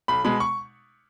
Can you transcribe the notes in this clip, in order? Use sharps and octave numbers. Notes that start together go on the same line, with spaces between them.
B1 B5
B2 G#3 B5
C#6